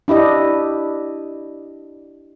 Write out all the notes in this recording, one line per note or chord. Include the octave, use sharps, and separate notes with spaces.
D4 E4 G4 D#5